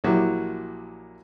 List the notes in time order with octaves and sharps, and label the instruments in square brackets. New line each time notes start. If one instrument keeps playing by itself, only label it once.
[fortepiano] A#1 F#3 E4 G4